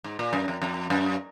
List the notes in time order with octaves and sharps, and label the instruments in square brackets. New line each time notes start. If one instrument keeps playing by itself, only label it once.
[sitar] G#2
A#2
F#2
F2
F2
F#2